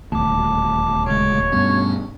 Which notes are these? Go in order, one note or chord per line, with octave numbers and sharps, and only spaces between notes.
D#1 D2 A5 D6
C#3 G#3 C#5
G2 B2 C#4 D4